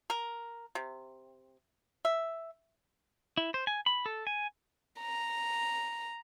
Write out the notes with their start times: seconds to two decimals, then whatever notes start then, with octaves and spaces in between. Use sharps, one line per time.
0.10 A#4
0.75 C3
2.05 E5
3.37 E4
3.54 C5
3.67 G#5
3.86 B5
4.06 A4
4.27 G#5
5.01 A#5